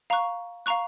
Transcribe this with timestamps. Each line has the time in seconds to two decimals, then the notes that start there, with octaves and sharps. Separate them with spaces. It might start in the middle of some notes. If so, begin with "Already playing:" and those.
0.10 F5 A#5 C#6 F#6
0.66 F5 A#5 C#6 F#6